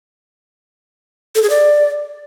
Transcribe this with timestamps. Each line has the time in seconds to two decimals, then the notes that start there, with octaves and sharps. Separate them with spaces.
1.35 A4
1.43 G#4
1.50 D5